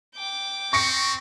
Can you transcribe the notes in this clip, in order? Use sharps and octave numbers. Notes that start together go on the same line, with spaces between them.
G5 D6
C4 C#6 A#6 C#7